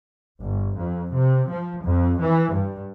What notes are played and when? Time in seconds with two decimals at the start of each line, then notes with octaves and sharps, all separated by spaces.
0.39 G1
0.77 F2
1.13 C3
1.49 F3
1.83 F2
2.20 E3
2.54 G2